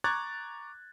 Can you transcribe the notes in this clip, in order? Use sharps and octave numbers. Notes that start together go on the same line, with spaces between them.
A#5 C#6 D6 F#6 G#6 A6